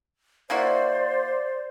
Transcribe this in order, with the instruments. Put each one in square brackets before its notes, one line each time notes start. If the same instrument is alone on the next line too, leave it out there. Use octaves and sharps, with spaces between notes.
[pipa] A#3 E4 F#4 [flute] C5 [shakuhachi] D5